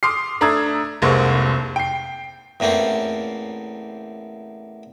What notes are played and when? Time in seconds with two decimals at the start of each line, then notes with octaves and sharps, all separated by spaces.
0.03 C6 D6 D#6 F6 C7
0.41 A3 D4 A#5 D#6 E6 G#6
1.02 F1 C2 G#3 A#3 C5 C#6
1.76 G5 C7
2.60 E2 A2 A#3 C4 C#4